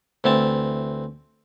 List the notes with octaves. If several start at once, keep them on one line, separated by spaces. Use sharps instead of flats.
D2 E3 C4 A5